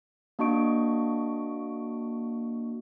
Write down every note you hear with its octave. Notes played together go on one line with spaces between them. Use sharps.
A#3 D4 F#4 D#5 C#6 D7